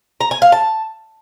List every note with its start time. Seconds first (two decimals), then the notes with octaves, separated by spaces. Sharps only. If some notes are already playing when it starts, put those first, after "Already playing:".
0.20 A#5
0.31 G#5
0.42 F5
0.52 A5